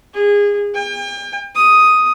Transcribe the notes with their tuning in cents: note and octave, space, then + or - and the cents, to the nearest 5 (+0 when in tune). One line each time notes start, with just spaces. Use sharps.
G#4 -25
G5 +40
D#6 +5